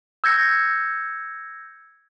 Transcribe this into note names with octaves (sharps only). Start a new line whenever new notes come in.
E6 G6 G#6 A#6 C#7